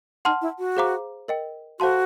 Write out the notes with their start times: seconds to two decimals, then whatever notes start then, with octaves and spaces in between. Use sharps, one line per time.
0.25 D#4 F#5 A5 C6 F6
0.42 E4
0.59 F#4
0.77 G#4 C5 F5 A#5 D6
1.28 A#4 D#5 G5
1.80 F#4 A4 C5 F5 A5 C6